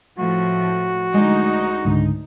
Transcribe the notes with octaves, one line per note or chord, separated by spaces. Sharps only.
A2 F3 F#4
D2 G#3 D#4 D5
C#2 G#2 D3